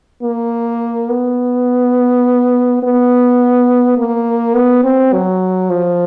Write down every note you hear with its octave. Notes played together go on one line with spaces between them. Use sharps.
A#3
B3
B3
A#3
B3
C4
F#3
F3